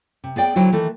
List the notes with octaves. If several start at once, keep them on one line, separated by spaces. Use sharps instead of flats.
C3
B3 G#4 D5 G5
D3 F#3 E4 F#4 C5 G5
D#3 E3 A3 A4